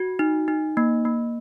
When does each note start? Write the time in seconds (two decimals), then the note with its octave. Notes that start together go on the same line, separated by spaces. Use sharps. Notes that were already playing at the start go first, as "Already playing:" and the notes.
Already playing: F#4
0.19 D#4
0.48 D#4
0.77 A#3
1.05 A#3